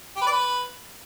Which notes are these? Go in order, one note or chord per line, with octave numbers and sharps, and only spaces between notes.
G4
B4
D5
B4